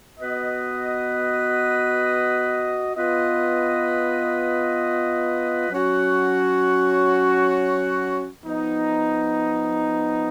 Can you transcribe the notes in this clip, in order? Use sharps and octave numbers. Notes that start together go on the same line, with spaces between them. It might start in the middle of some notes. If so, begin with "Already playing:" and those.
B3 F#4 B4 D#5
B3 F4 B4 D#5
F#3 C#4 F#4 C#5
F3 B3 D#4